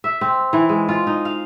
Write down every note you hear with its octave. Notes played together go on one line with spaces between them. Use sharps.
E5
C4
E3
G#3
F4
D#4
F5